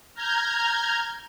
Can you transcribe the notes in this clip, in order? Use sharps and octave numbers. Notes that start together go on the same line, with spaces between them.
A#5 F6 G6 G#6